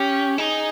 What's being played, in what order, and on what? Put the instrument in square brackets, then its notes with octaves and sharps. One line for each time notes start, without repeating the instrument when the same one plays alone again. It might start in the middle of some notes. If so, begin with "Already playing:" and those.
Already playing: [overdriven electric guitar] C#4 [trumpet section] G4
[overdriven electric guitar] D#4 [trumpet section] G#4